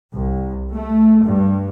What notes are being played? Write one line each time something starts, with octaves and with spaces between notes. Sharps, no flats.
C2
A3
G2